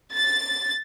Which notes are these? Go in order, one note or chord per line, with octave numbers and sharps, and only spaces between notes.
A6